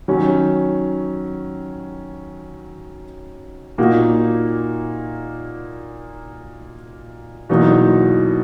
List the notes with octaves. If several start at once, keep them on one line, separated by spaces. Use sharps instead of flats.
D#3 F#3 C#4
A#2 A#3 D#4 F#4
E2 B2 F#3 A#3 D#4